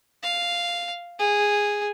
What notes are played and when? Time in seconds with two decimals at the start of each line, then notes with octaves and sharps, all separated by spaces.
0.23 F5
1.19 G#4